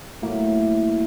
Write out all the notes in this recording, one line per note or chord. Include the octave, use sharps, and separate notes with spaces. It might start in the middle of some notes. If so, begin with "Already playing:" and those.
A2 F#3 A#3